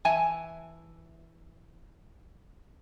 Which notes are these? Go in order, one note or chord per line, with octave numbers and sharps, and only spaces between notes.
E3 E5 G#5 A5